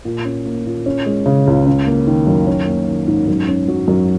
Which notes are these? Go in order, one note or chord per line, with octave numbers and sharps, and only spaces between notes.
A#2
C#4
A#3
A#2
C#4
G#3
C#3
C#2
C#4
A#3
D#3
F#2
C#4
A#3
D#3
G#2
F#2
C#4
F#3
F#2